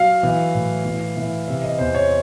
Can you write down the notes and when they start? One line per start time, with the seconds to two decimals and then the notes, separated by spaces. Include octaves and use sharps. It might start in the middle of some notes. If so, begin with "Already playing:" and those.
Already playing: F#3 F5
0.23 E3
0.54 A2
0.85 E3
1.17 E3
1.48 C3 E5
1.63 D#5
1.78 E2 C5
1.95 C#5